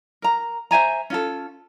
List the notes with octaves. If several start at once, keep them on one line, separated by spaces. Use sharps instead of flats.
A#4 A#5
C5 E5 G#5 A#5
C#4 F4 A4